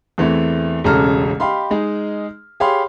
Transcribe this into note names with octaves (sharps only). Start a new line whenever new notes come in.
E2 E3 A3 C4
E1 A1 C#3 A4 A#5 F6
G4 D#5 F5 B5 C6
G#3 D#4 G#4
G4 G#4 C#5 F5 B5 C6